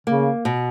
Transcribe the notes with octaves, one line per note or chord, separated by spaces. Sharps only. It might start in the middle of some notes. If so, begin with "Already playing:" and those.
C#3 A#3
B2